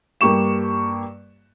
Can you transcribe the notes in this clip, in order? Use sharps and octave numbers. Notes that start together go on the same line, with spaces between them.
G2 A#3 G4 C#6 E7